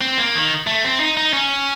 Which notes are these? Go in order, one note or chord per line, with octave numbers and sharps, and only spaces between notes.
C4
A#3
D#3
A3
C4
D#4
D#4
C#4